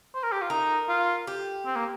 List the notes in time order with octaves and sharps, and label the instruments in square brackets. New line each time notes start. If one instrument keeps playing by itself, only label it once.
[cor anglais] C5
A#4
G4
F4
[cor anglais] D#4 [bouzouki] A#4
[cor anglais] F4
[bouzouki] G4
[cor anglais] C4
A#3